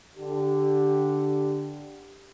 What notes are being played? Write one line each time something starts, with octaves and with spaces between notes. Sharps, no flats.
D3 G4